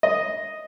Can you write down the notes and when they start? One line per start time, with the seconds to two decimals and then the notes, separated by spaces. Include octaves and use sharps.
0.03 D#5